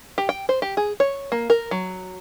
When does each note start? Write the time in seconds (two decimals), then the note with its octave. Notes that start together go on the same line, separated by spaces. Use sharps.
0.18 G4
0.29 G5
0.49 C5
0.62 G4
0.77 G#4
1.00 C#5
1.32 A#3
1.50 A#4
1.71 F#3